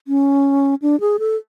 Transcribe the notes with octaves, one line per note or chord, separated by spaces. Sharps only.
C#4
D4
G#4
A4